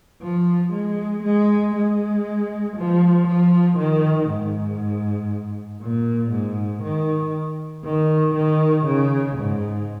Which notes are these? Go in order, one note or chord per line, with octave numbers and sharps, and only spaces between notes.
F3
G#3
G#3
G#3
F3
F3
D#3
G#2
A#2
G#2
D#3
D#3
D#3
C#3
G#2